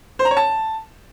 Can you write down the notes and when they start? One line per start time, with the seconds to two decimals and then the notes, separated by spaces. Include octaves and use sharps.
0.19 C5
0.25 A#5
0.31 C#5
0.37 A5